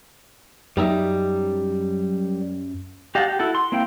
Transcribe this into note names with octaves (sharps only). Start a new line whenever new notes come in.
F#2 G3 D#4 E5
G4 D#5 F5 F#5 A5
G4
E4 F#4 A4
C6
A#3 C4 E4 F5 G5